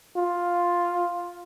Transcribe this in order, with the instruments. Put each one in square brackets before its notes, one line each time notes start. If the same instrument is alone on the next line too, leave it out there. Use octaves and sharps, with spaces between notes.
[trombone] F4